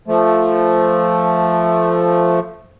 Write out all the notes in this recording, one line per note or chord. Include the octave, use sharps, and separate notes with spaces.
F3 A3